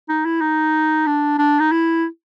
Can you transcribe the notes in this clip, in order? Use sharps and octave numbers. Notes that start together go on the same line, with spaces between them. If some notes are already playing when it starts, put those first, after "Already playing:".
D#4
E4
D#4
D4
D4
D#4
E4